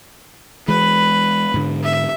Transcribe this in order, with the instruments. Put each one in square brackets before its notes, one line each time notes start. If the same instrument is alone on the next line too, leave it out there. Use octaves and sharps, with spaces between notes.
[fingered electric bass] E3 G#3 [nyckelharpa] B4 B5
[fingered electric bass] G#2 D3
[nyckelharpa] E5